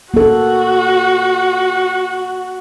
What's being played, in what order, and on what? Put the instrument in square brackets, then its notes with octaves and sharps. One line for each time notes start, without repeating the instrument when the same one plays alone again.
[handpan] A#3 A4 [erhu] F#4